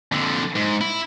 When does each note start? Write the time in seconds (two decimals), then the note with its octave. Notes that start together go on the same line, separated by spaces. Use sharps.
0.12 F2 D3
0.55 G#2
0.81 E4